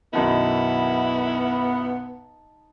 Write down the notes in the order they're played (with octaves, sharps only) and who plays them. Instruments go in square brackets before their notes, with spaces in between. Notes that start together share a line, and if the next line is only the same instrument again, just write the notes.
[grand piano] B1 F#2 D#3 [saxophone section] B3 [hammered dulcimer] D#4 A5 B5 [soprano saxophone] E4